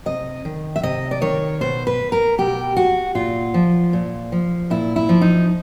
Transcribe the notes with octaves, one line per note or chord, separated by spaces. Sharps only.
C3 D#5
D#3
E5
C3 D#5
D5
D#3 C#5
B2 C5
B4
A#4
B2 G4
F#4
A#2 F4
F3
A#2
F3
A#2 E4
E4
F3
D#4